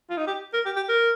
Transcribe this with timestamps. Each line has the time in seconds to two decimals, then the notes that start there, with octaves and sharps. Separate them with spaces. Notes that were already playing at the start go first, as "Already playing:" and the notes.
0.10 F4
0.17 D#4
0.27 G4
0.53 A#4
0.65 G4
0.76 G4
0.89 A#4